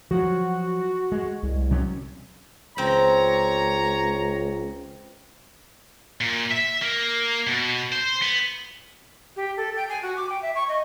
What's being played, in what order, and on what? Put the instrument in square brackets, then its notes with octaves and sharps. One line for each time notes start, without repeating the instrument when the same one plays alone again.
[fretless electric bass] F3 F#3 [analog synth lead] F#4
[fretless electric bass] G#3
[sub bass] C2
[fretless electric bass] C3 F#3 C#4
[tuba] C#2 [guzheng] C4 [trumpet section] C#5 A#5
[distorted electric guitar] A#2
E5
A#3
B2
C5
B3
[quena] G4
A4
G5
G#5
F#4
D6
G5
E5
C#6
D#5